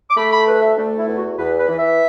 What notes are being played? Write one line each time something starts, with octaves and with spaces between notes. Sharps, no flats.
D6
A3 B5
B5
D2 B4
E5
A3 D4
E4
E2
F#4
E2 B4
B4
E3
E5